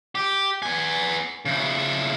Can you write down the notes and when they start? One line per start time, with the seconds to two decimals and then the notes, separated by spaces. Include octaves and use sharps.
0.15 G4
0.62 B3 G#5
1.45 C#3 E4